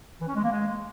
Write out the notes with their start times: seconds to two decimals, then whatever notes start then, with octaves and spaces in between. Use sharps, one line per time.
0.20 E3
0.28 C#4
0.35 G#3
0.43 A#3
0.51 G#3